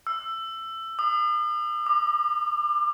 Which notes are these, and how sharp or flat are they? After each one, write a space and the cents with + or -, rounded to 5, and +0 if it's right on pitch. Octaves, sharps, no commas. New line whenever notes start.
E6 +15
D#6 -45
D6 +30